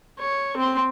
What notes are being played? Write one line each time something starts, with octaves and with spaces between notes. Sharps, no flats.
C#5
C4 C6